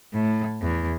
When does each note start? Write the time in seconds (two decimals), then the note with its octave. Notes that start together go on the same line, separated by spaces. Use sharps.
0.14 A2
0.61 E2